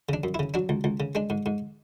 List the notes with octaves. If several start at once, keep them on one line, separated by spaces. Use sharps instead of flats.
C#3 D4
F#2
C#3 E4
F#3 D4
C#2
C#2
C#3
G#3 D4
G#2
G#2